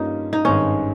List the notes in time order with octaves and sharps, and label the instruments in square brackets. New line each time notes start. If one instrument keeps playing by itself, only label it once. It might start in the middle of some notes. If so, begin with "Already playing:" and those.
Already playing: [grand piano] G2 G3 A#3 C#4 F4 [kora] D#4
[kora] D#4
[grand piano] G#1 G2 D#3 G#3 C4 [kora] C#4